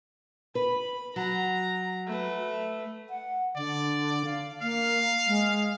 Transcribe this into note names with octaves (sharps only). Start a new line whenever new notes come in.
B4 B5
F#3 A#5
A3 B4
F#5
D3 D5
F5
A#3 F5
G#3